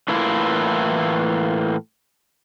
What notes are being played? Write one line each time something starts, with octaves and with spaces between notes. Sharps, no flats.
A2 E3 A#3 E4 F4